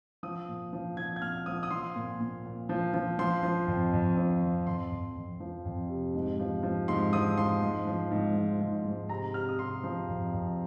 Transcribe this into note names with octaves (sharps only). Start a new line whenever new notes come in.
F3 D#6
A#2
F3
F3 G#6
G#6
A#2 F6
F3 D#6
D#6
F3 C6
A#2
A#2
A#2
F3
F3
F3 C6
F3
F2
F2
F3
F2
F2 C6
F2
F2
F3
F2
C3
G#2
F3
F3
G#2 C6
F3 D#6
F3 C6
G#2
F3
G#2
F3
G#2
G#2
C3 A#5
C3 F6
D#6
C3 C6
F3
F2
F2